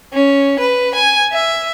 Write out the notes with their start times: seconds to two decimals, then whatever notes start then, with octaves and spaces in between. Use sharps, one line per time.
0.13 C#4
0.59 B4
0.95 G#5
1.33 E5